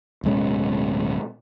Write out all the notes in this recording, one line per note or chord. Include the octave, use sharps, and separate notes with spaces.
D1 B2 G#3 C#4